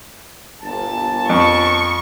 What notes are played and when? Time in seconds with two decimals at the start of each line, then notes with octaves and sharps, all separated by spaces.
0.62 G1 A#2 A5
1.29 F2 C#6